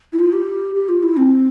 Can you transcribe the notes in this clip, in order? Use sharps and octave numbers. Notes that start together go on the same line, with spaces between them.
E4
F4
G4
G4
F4
E4
C4